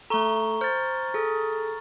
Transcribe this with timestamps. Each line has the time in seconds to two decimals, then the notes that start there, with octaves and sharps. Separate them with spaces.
0.10 A3 A4 A#5 C#6 G7
0.61 C5 F6 A6
1.14 G#4 A4